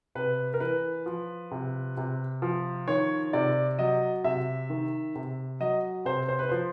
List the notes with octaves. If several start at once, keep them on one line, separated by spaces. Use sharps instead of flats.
C3 B4
A#4
E3 B4
F3
C3
C3
F3
D#3 C#5
C3 D5
F#3 D#5
C3 E5
D#3
C3
F#3 D#5
C3 C5
C5
B4
F3 C5